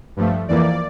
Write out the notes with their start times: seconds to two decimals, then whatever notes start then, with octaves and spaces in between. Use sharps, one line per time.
0.17 G2 F3 A3
0.48 F2 E3 A#3 D5